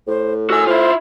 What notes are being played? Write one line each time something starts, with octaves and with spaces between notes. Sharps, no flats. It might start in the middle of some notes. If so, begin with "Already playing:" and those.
A2 C5
F#4 G#5 E6
E4 F4 C5